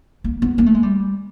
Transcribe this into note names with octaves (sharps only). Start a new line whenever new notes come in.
A#3
B3
A#3
A3
G#3
G3